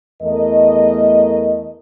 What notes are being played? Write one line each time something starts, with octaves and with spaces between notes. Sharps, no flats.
E2 A3 A#4 D#5